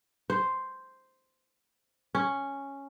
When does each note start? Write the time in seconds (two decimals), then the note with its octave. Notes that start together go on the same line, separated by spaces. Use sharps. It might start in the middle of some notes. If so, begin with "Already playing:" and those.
0.30 C5
2.15 C#4